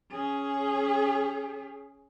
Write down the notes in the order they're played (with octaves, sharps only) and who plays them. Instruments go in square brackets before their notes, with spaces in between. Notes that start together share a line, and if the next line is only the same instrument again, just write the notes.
[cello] C#4 G#4